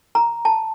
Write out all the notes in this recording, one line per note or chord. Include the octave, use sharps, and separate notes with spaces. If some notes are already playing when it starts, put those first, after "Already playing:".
A#5
A5